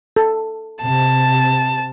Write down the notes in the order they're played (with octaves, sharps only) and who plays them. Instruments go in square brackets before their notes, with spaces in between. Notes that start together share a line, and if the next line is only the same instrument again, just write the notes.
[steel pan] A4
[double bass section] C3 [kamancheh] A5